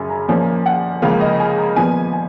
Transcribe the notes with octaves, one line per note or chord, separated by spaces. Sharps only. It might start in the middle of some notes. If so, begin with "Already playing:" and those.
Already playing: F#2 C#3 F#3 C#4 G#5
A#5
A#2 F3 A#3 C#4 G#5
F#5
C#2 C#3 F3 A#3 F5
D#5
G#5
A#5
A#2 F3 B3 G#5
G#5